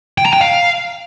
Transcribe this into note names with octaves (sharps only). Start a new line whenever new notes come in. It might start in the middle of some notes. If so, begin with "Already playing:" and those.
G5
A#5
G5
F5